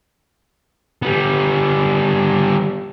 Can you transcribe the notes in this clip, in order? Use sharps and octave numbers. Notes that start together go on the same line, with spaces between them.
G3 B3